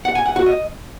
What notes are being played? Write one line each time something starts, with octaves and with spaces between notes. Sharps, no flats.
F#5
G#5
F#5
F#4
D#5